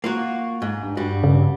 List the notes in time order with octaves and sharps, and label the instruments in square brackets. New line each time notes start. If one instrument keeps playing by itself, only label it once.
[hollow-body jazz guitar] A#3 F4 F#4
G#2
[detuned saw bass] G2
[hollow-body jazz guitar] G3 F#4
[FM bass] C#3